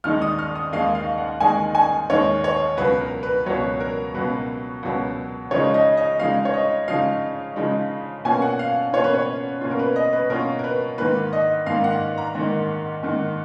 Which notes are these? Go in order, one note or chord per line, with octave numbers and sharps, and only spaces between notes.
D#2 D#3 G#3 D#4 F6
D#6
F6
D#6
D#2 D#3 G#3 D#4 F5
F5
F#5
D#2 D#3 G#3 D#4 G#5
G#5
D#2 D#3 G#3 D#4 C#5
C#5
C#2 B2 F#3 B4
A#4
B4
C#2 B2 F#3 C#5
A#4
C#2 B2 F#3 B4
C#2 B2 F#3
C#3 F3 G#3 D#4 C#5
D#5
D#5
C#3 F3 G#3 D#4 F5
C#5
D#5
C#3 F3 G#3 D#4 F5
C#3 F3 G#3 D#4
B2 A#3 C#4 F4 G#5
F#5
F5
B2 A#3 C#4 F4 C#5
B4
C#5
B2 A#3 C#4 F4
A#4
B4
D#5
B4
B2 A#3 C#4 F4 A#4
A#4
B4
G#2 D#3 A#3 B4
D#5
G#2 D#3 A#3 F5
F#5
A#5
G#2 D#3 A#3
G#2 D#3 A#3